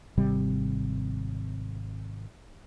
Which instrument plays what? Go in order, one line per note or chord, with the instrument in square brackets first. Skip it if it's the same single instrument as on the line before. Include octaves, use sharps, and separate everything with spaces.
[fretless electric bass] G#1 C3 G3